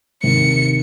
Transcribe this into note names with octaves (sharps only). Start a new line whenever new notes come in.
D#2 C3 D#3 C#7